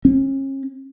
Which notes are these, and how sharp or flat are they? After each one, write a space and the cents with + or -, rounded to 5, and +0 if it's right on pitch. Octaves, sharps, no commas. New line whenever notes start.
C#4 -40